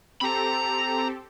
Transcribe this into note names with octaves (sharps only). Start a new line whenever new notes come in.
C4 G4 A4 A#5 B5